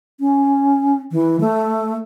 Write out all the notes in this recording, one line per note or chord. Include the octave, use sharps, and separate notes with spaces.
C#4
E3
A3